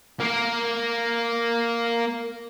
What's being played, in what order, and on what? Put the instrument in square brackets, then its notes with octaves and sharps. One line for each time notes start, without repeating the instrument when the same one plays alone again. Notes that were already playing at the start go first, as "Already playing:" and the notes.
[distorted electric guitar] A#3 A#4